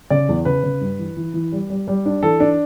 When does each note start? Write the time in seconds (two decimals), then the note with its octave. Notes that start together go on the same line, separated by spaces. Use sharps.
0.10 C#3 D5
0.29 E2
0.45 C#3 B4
0.64 C#3
0.81 G2
0.99 E3
1.17 E3
1.34 E3
1.52 G3
1.70 G3
1.88 G3
2.06 D4
2.23 E3 A4
2.40 D4